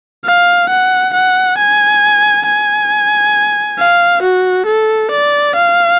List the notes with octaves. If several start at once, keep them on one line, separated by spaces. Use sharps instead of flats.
F5
F#5
F#5
G#5
G#5
F5
F#4
A4
D5
F5